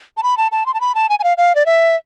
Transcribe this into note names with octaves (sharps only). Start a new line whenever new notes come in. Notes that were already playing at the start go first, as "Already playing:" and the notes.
A5
B5
A5
A5
C6
A5
B5
A5
G#5
G#5
F5
F5
D5
E5